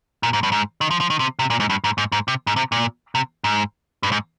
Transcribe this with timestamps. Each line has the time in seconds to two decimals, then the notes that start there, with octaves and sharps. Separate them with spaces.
0.23 A#2
0.33 G#2
0.43 G2
0.52 G#2
0.81 D#3
0.91 F3
1.01 F3
1.10 D#3
1.20 C3
1.39 C3
1.50 A#2
1.60 G#2
1.70 G2
1.84 G#2
1.98 G#2
2.12 G#2
2.28 C3
2.47 G#2
2.56 C3
2.72 A#2
3.15 C3
3.44 G#2
4.03 G2
4.12 G#2